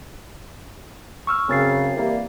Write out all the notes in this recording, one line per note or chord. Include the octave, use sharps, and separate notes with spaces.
C#6 E6 F6
F#2 C#3 C4 A6 C7
E3 G3 A#3